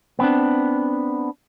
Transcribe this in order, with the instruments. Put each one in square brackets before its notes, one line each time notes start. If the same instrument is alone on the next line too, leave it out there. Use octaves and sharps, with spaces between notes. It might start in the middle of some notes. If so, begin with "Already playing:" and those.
[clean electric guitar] B3 C4 D4